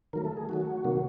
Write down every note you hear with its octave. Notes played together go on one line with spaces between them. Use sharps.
D#3 F#3 A3 A#4
A4
G#4
D#3 F#3 A3 F#4
C3 D#3 F#3 A#3